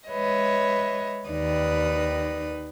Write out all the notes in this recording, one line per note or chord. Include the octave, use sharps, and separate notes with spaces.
G#3 B4 C#5 D#5 E5
D#2 D#3 D#4 B4 D5 D#6